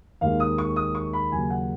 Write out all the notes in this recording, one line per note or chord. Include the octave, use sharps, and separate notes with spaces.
D#2 D#3 G#3 F5
D#6
C#6
D#6
C#6
B5
D#2 C#3 F#3 G#5
F#5